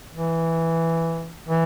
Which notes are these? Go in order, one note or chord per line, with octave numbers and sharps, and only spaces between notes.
E3
E3